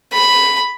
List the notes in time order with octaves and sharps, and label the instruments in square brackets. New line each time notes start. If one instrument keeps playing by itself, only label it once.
[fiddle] B5